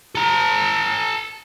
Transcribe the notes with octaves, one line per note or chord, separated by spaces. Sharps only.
A4 A#5